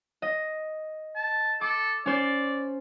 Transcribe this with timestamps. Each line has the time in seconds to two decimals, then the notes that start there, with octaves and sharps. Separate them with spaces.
0.22 D#5
1.16 A5
1.61 A4 D6
2.06 C#4 C5 D5